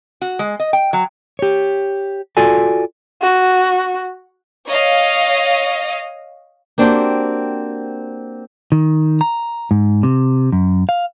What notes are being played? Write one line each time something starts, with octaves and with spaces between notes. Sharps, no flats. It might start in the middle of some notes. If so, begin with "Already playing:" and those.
F#4
G#3
D#5
G5
F#3
G4 C#5
F4 F#4 A4 D5 G#5
F#4
C#5 D#5 F5
A#3 C4 D4 F#4 G4 C5
D#3
A#5
G#2
C3
F#2
F5